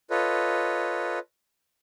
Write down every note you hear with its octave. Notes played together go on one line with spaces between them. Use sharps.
F4 A4 B4 C#5 D#5